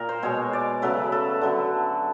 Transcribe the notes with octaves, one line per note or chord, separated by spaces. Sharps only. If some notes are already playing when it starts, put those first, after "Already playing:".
Already playing: A#2 A#4
C5
B2 G#3 C#5
D5
C#3 F#3 A3 B4
A4
D3 F#3 A3